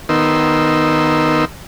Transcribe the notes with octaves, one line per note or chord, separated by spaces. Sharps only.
D#3 B3 D#4 A#4 C6 E6